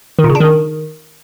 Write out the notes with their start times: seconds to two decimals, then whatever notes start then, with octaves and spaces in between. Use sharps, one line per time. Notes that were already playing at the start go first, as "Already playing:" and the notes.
0.19 D#3
0.24 A#2
0.30 C#3
0.35 D4
0.40 D#3